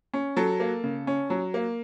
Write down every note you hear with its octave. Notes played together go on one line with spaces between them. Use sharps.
C#4
F#3 A4
A#3
C#3
C#4
F#3
A#3